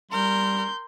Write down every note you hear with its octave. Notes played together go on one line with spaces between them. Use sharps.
G3 A#4 C6 G6